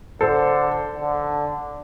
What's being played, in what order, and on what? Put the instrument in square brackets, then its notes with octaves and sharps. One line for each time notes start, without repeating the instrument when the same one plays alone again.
[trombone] D3 [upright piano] A4 C5
[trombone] D3